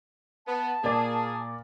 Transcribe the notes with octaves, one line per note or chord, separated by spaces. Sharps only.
B3 A5
A#2 A#3 G#4 D5